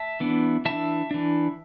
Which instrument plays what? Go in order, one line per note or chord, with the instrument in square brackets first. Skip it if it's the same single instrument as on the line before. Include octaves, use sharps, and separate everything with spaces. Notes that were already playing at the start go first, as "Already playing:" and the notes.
Already playing: [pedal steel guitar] E5 A5
E3 B3 D4
E3 D4 E5 A5
E3 D4